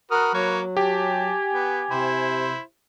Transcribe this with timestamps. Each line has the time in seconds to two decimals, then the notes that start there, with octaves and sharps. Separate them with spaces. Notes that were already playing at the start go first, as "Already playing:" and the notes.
0.11 F#4 A#4 B4 D#6 F6
0.34 F#3 A#3 C#5
0.77 G4 G#5 A5
1.53 B3
1.91 C3 E4 C5